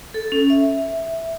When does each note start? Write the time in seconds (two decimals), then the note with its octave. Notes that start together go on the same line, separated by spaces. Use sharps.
0.14 A4
0.32 C#4
0.50 E5